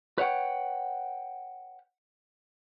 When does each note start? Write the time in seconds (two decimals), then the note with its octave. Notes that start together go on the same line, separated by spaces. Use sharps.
0.18 B4 C#5 E5 F#5 G5